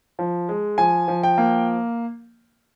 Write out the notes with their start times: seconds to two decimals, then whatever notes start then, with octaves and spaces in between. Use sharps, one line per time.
0.19 F3
0.49 G#3
0.78 F3 G#5
1.08 F3
1.23 G5
1.38 A#3